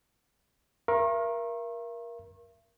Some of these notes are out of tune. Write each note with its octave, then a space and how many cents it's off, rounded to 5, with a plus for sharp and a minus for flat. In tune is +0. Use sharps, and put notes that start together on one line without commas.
A#4 +20 E5 +45 C#6 -40